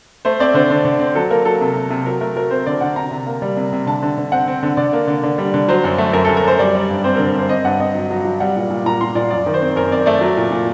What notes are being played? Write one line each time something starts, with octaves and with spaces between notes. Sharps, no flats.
A3 C5
C4 D5
D3 C5
D3
D3
C4
F#3 A4
A#3 A#4
F#3 A4
C3
C3
C3
F#3 A#4
A3 A#4
F#3 A#4
C4 C5
D3 D5
D3 F#5
C3 A#5
C3
A#3
G3
C3
C3
D3 A5
D3
D3
C4 F#5
C4
D3
D3 D5
A#3
D3
D3
G3
D3
F#3 C5
F#2
A3
F#2 A#4
A4
F#2
A#4
F#2 C5
G3 D5
G3
G2
C4 C5
A#4
D3
A#4
C4 C5
C4 D#5
G2 F#5
C4 D#5
F#3
F#3
F#3
G3 F#5
A#2
A#2
A#2 A#5
A#2 C6
A#2 D5
F#2 D5
D#3
C5
C4
F#2 A#4
C4 D5
A3 D5
F#3
A#2
A#2